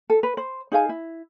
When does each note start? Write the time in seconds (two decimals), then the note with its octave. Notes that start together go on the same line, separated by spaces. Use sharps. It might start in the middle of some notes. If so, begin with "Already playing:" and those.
0.10 A4
0.23 B4
0.37 C5
0.72 D#4 G#4 F5 G#5
0.89 E4